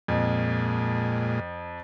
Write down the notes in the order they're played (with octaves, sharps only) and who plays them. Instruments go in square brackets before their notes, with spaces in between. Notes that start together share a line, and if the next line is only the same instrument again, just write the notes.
[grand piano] F2 [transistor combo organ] A#2 G#3